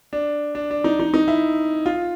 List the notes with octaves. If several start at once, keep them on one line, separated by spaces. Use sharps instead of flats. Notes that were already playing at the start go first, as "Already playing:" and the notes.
D4
D4
D4
D#4
D#4
D#4
E4
F4